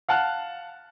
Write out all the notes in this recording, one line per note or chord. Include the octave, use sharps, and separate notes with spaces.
F5 F#5 A5 F6 F#6